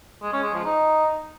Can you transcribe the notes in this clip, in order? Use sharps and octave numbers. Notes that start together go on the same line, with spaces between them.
G#3
C#4
G#3
F3
D#4